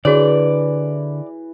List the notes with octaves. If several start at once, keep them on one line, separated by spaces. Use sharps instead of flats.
D3 E3 F#4 G#4 C#5 D5